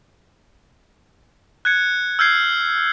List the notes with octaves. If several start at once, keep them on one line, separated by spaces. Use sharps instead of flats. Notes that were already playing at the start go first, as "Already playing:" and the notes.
F#6 G#6 C#7
E6 F6 G6 G#6 C7 C#7